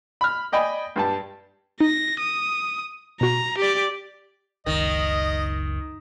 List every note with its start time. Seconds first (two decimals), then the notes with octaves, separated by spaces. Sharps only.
0.21 B5 F6
0.52 D5 D#5 G5 G#5 B5
0.96 G2 G3 A5
1.80 D#4 A#6
2.19 D#6
3.21 B2 F#4 A#5
3.58 G4 D5
4.66 F#1 C#2 D#3 D#5